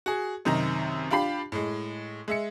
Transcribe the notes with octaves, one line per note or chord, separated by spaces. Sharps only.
F#4 G#4
F#2 C3 D#3 D#5 A#5
D4 F4 G4 B5 C7
A2 G#3
G#3 E5 C#7